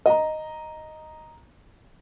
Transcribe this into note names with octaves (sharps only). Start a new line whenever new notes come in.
D#5 A#5